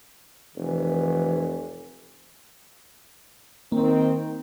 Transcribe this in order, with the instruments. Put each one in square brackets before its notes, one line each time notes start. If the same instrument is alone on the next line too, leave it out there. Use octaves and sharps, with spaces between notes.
[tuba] F1 [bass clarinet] E3
[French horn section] D#3 C4 [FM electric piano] A#3